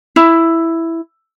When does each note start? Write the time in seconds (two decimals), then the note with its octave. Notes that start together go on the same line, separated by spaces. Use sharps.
0.16 E4